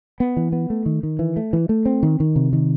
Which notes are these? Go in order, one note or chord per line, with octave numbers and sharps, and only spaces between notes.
B3
E3
B3
A3
D#3
D#3
E3
A3
E3
A3
C4
D#3
D#3
C3
D#3